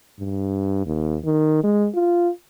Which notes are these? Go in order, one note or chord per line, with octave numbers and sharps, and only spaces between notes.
G2
D#2
D#3
G#3
F4